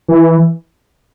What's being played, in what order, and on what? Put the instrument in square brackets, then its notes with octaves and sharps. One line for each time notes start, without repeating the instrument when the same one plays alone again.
[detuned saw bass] E3